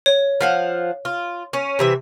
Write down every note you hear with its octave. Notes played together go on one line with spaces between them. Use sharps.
C#5
F3 F5 F#5
F4
C#4
C3 E3 E5